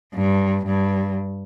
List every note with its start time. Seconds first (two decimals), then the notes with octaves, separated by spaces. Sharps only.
0.14 G2
0.66 G2